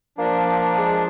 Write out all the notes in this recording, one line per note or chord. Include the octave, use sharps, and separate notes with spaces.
F3 A#3 D4
G#3